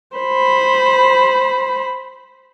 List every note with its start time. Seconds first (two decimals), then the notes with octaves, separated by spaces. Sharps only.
0.17 C5 B5